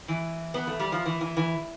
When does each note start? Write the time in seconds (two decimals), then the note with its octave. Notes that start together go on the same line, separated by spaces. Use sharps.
0.08 E3
0.54 B3
0.67 A3
0.79 G3
0.92 F3
1.05 E3
1.21 E3
1.37 E3